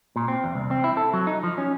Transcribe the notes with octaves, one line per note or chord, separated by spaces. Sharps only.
A#2
C4
E2
C2
C4
E4
A4
F#3
D#4
F3
C#4